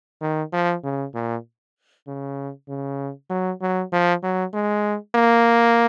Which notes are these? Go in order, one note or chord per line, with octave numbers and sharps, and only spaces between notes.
D#3
F3
C#3
A#2
C#3
C#3
F#3
F#3
F3
F#3
G#3
A#3